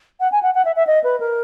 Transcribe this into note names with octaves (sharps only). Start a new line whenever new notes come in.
F#5
G#5
F#5
F#5
E5
E5
D#5
B4
A#4